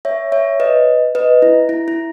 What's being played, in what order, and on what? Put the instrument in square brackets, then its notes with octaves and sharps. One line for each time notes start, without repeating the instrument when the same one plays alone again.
[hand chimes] C#5 E5
C#5 E5
B4 D#5
B4 D#5
E4
E4
E4